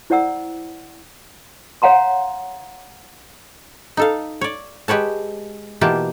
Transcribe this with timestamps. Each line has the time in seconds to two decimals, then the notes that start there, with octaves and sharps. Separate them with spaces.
0.10 E4 C5 D5 F#5 A#5 E6
1.82 C#5 F5 F#5 A#5 C6
3.97 D#4 A4 F5
4.41 C#5 D5
4.88 G#3 G4 B4 C#5 A5
5.81 B2 E3 A#3 F4 G4 A5